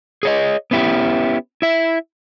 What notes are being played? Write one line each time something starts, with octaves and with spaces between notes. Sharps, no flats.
G#4 C#5 D#5
B3 C#4 E4 G4
E4 E5